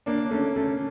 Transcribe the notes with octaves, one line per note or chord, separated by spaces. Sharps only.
A#3 D4
D4
A3 C#4
A3 C#4